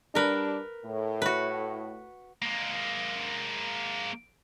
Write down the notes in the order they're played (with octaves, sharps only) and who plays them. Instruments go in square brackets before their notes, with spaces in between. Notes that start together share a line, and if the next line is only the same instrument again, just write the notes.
[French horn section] G3 D4 [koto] A#4 B4
[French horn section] A2
[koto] F#4 B4
[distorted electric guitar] G#3 A#3